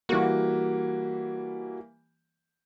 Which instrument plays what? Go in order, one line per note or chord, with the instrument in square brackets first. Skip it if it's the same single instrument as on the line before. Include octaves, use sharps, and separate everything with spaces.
[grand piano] E3 G3 A#3 [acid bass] F#4